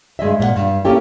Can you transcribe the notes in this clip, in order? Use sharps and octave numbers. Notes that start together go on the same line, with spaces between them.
G2 G#3 D#5 E5
A#2 D5 F#5
G2
A#3 C#4 E4 G4 A4 G5